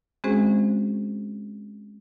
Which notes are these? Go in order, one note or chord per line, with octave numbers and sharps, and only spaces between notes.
G#3 C4 C#4 F#4 G#4 C5